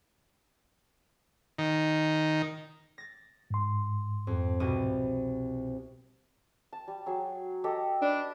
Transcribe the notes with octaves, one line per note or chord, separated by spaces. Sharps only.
D#3
A6 A#6
G#2 C6
F2
C2 B2 D#7
A5
G3
F#3 G#4
G4 A4 D#5
D4 B4